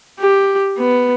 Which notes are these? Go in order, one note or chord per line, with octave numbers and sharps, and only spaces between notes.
G4
B3